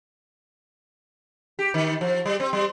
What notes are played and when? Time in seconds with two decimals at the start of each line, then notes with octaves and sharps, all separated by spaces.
1.59 G4
1.74 D#3
2.01 F3
2.26 G3
2.40 C4
2.53 G3